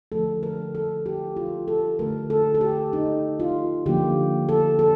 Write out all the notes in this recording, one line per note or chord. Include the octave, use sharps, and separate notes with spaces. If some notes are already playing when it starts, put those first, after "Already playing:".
D3 F3 A3 A4
A#4
A4
G4
F4
A4
D3 A3 A#4
A4
A4
G4
D#4
F4
D3 F3 A#3 G4
A4
A4